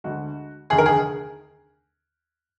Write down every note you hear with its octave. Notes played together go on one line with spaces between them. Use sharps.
D2 D3 G#3 F#4
F1 D#2 D3 G#4
A#4
G#4